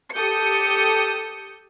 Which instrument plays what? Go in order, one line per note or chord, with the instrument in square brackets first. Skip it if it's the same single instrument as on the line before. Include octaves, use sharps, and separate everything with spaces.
[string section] G4 A4 D#6 G6 C#7